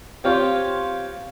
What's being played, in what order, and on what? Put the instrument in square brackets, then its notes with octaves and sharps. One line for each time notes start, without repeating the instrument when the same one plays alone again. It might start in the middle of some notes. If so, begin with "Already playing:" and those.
[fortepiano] C4 F4 C#5 [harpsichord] G4 F5 A5